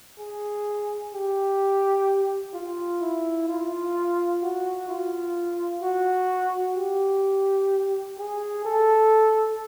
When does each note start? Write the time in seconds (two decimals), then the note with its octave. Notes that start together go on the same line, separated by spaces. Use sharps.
0.19 G#4
1.14 G4
2.53 F4
3.01 E4
3.48 F4
4.42 F#4
4.89 F4
5.82 F#4
6.76 G4
8.18 G#4
8.65 A4